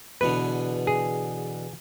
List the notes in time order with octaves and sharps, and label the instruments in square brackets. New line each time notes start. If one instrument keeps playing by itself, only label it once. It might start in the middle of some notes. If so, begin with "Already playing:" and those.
[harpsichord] E2 B2 D3 [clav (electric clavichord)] B4
[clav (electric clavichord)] G#4